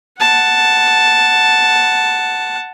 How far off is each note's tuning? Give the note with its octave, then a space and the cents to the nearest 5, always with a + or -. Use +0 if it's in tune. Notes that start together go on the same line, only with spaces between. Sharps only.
F#5 +0 A5 +0